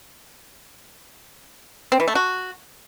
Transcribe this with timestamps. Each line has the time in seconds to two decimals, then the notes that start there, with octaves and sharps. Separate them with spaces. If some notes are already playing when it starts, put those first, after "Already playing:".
1.92 C4
2.00 E3
2.08 A3
2.15 F#4